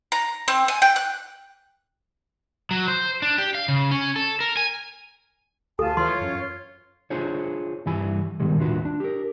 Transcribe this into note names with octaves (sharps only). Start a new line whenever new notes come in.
A#5
C4
G#5
G5
F#6
F#3
C5
D4
G4
F5
C#3
C#4
A4
A#4
G#5
D2 F4 A4 G#5 A5
E3 F4 C#5 C6
F#2
D4 F4 G#4 C5 C#5
G2 E3 G3 E4 G#5
G#2 B2 D#3 G3 G#3
D#2 A2 D4 F4 F#4 B4
D4
G4 A#4